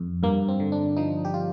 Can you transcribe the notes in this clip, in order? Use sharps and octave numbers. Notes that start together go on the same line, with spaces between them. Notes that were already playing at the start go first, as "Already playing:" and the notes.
Already playing: F2
G2 A#3
C4
D3
D4
F3 D#4
G4
F4